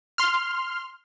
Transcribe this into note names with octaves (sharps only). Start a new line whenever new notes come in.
C6 F6